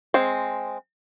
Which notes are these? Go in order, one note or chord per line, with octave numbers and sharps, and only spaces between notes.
G#3 C4